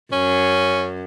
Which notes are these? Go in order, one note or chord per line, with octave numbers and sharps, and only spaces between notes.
F#2 C#4